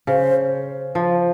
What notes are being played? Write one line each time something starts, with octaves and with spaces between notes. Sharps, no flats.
C#3 C5
F3